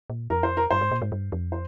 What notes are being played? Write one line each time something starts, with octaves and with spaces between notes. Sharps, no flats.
A#2
F2 A#4
C5
A#4
G2 C5
G#2
A#2
G#2
G2
F2
C5